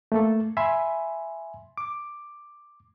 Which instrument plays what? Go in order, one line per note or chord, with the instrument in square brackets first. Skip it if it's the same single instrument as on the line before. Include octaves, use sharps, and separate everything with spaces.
[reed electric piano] A3 A#3 A4
E5 G#5 B5 C6
D6